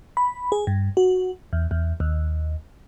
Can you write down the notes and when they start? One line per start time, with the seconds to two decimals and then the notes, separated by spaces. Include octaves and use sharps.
0.17 B5
0.52 G#4
0.67 G2
0.97 F#4
1.53 E2
1.71 E2
2.00 D#2